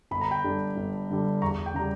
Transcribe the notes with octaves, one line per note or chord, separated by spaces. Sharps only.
G1 B5
A#5
G5 B5
G2 D3 G3
G1
G2 D3 G3
E2 A#5 C#6
G5
C#3 G3 A#5